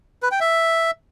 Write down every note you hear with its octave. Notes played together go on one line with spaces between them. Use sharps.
B4
G5
E5